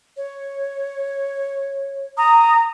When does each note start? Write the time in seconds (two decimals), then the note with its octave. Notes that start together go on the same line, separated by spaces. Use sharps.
0.17 C#5
2.17 A#5 D#6